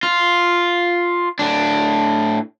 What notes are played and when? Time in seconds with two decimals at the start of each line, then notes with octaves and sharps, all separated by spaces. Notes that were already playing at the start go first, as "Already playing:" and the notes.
0.03 F4
1.39 A2 D4